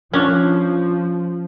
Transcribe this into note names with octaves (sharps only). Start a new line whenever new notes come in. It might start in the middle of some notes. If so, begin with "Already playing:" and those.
F3 C#4 D4